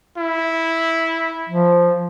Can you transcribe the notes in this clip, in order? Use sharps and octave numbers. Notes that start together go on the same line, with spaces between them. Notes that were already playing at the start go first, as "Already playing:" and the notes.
E4
F3